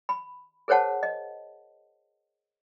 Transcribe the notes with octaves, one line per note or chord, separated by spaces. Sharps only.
B5
G#4 A#4 C5 C#5 F#5 A5
D#5